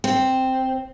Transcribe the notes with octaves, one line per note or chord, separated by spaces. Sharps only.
C4